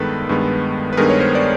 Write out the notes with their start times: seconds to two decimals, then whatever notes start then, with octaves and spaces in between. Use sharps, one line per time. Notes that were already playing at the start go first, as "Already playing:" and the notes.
Already playing: G2 D#3 G#3 B3 A4 B4
0.29 G2 D#3 G#3 B3
0.93 B4
0.97 G2 D#3 G#3 B3 G#4 A#4
1.10 C#5
1.20 A#4 C5
1.35 D5